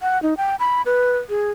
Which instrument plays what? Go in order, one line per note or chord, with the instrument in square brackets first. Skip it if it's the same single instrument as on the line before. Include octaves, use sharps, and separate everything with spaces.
[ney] F#5
D#4
G5
B5
B4
G#4